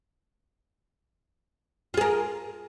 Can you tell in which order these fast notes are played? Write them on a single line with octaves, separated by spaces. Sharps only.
F4 G#4 A#4